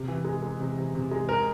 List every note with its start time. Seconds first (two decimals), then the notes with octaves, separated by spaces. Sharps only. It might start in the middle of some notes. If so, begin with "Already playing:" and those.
Already playing: C3
0.08 E3
0.25 G#3
0.42 G#3
0.60 C3
0.78 C3
0.95 C3
1.11 G#3
1.29 G#3 A#4